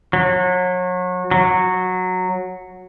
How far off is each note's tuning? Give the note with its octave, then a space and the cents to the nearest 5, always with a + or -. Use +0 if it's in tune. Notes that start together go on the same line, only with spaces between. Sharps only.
F#3 -30
F#3 -10